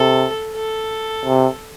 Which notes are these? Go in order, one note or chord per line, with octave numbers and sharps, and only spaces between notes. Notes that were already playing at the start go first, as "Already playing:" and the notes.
Already playing: C3 A4
A4
C3